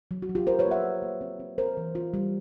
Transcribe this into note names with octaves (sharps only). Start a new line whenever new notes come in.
F#3
F#4
F#3
F4 G4
F#3 A#4 C5
B4 C#5
A#3
E5 F#5
F#3
A#3
C4
C4
C4 A#4 C5
E3
F4
G3